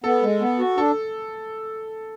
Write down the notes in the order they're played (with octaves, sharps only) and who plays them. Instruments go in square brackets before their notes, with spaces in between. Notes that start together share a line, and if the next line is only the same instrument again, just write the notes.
[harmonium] B3 [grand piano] A4
[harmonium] G#3
B3
F#4
[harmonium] D4 [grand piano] A4